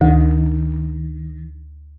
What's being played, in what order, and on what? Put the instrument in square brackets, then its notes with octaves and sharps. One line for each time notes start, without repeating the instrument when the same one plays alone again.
[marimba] D2 [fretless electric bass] D#3